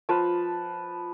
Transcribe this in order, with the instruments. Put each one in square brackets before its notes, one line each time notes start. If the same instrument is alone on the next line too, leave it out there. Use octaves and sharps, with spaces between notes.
[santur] F3 B4 A5